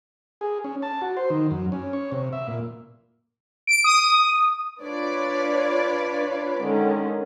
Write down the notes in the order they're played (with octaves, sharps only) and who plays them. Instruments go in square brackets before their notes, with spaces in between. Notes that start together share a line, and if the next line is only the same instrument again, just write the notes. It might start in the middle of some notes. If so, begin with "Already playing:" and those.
[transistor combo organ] G#4
C#4
A5
F#4
C5
D#3
F#2
C#4
C#5
C3
E5
A#2
[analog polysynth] D7
D#6
[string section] D4 F4 B4 C#5 D5
D3 D#3 G#3 C#4